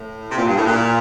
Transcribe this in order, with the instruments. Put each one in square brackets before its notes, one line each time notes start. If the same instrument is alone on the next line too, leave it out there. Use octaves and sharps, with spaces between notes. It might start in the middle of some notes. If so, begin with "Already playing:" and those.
Already playing: [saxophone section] A2
C3
A#2
G2
A2
A#2